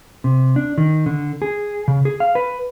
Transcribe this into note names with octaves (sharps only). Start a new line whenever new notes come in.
C3
D4
D#3
D3
G#4
C#3
G#4
F5
B4